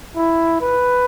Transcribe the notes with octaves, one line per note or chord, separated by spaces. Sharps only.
E4
B4